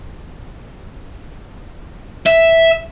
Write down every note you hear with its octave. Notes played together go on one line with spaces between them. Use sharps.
E5